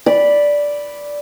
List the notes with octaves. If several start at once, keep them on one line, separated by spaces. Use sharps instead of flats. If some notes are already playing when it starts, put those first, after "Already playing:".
D5 B5